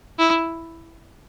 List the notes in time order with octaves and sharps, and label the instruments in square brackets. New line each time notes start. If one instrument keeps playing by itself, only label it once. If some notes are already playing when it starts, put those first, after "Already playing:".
[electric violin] E4